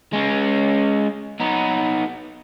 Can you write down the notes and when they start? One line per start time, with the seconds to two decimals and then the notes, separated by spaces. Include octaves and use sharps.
0.13 G#3 C#4
1.40 B3 D#4